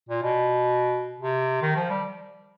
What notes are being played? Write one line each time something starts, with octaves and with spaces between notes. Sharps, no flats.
A#2
B2
C3
D#3
F3
G3